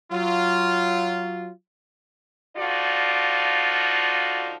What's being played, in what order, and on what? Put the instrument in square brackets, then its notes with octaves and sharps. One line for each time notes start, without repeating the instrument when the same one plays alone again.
[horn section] F#3 F4
[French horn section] D3 F3 D#4 F4 F#4 D5